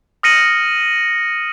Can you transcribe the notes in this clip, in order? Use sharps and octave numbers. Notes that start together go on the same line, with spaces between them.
D#6 F6 A#6 C#7 D#7 F#7